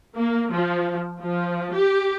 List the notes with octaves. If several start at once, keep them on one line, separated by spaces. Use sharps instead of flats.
A#3
F3
F3
G4